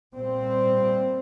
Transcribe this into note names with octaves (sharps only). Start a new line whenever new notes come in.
A#2 G3 C4